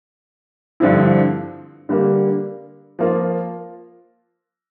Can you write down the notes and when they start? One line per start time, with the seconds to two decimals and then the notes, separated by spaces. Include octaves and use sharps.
0.80 G2 D3 F3 C4 E4
1.89 D3 G3 A#3
2.99 F3 A#3 F4